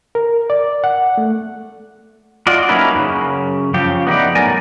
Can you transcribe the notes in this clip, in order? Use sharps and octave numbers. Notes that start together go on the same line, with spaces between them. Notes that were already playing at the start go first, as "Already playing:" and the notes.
A#4
D5
F#5
A3
F4 F#4 D5 D#5
F#3 A#3 C#4 D#4 E4 B4
F#2 C#3
C#3 F3 G4
B3 D#4 E4 D5
A2 F#3 A#4 D5 G#5